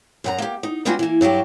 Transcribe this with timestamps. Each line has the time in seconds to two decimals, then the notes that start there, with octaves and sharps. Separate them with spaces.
0.24 F#2 F#5 A#5
0.38 A#3 G4
0.63 D#4
0.85 G3 B3 C#4 D4 F4 F#4
0.99 E3 A#3
1.21 G2 F#3 F#4 G4